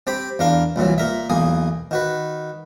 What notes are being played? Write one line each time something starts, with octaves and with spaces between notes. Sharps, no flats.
C4 G4 G5 B5
E2 D4 A#4 F5
C2 A#2 E3 F#3
A#2 A#4 E5
B1 E2 A#3 G#5 D#6
D#3 F#4 B4